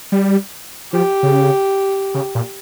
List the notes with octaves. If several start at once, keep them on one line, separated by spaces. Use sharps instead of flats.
G3
F3 G4
C#3
C#3
A#2